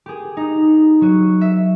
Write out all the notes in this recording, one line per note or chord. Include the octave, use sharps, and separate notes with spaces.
G4 G#4
D#4
F#3 F#4 D#7
E5